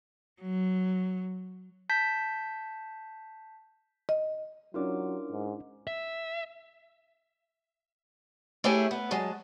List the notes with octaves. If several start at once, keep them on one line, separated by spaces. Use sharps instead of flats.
F#3
A5 G6 B6
D#5
F#3 C#4 D4 E4 F4 A#4 D6
G#2
E5
A3 E4 G4 G#4 C#5 E5
B3
F#3 G#3 A5